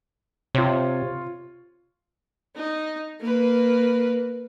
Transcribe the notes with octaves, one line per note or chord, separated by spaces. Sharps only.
C3 F4 C#5
D#4
A#3 B4